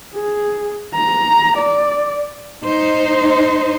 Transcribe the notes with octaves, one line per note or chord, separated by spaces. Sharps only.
G#4
A#5
D5
D#4 C5